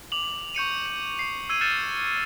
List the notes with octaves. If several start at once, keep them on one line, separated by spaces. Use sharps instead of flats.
D6 F7 F#7
C#6 G6 C#7 D#7
C#7
C7
E6 G#6 D#7
F6 G6 A6 C#7 D#7 E7